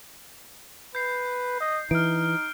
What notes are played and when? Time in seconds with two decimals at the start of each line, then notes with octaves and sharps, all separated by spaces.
0.95 B4 G6 C7
1.61 D#5
1.91 E3 D#4 F6 D7